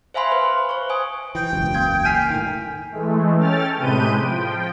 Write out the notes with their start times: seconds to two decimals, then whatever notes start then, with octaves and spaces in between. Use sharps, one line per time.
0.14 C5 E5 F5 G#5 B5 C6
0.31 B4 C5
0.69 C5 C#6
0.89 C5 G#5 D#6
1.35 E3 G5
1.53 E1 C#2 F#2
1.74 A#3 G6 G#6
2.05 G#5 F6 B6 C7
2.30 A2 D#3
2.92 E3 G#3 A3
3.36 C#4 A4 G5 F6 A6
3.77 A2 C3 G#3 B4 G6 D#7
4.18 F3 G5